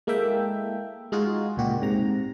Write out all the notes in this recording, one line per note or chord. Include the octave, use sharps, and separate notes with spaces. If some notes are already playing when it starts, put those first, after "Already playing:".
G#3 A#3 E4 A4 E5 G5
G#3 D#4 F4 F#4 G#4
C#2 A#2 F#4 G4
G#2 C3 A#5